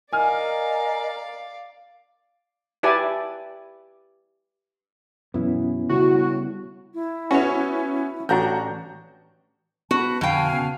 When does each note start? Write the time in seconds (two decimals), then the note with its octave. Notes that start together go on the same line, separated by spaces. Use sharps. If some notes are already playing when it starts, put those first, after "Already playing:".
0.13 A#4 D5 D#5 F5 G#5 F6
2.83 E4 G4 B4 D5 G#5 A5
5.34 F#2 B2 E3 B3 C#4 E4
5.89 A2 C#3 G3 F#4
6.94 E4
7.31 B3 C#4 F#4 C#5
8.29 A1 D4 F#4 A#5 G6
9.91 B3 F#4 A5 B5
10.21 F2 B2 D3 F5 G5 G#5
10.52 C#3 B3